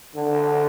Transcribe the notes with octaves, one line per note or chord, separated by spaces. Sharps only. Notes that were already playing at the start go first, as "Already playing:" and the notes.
D3